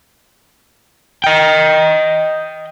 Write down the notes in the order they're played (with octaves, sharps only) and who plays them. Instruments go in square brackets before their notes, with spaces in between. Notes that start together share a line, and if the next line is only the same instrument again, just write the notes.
[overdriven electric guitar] D#5 G5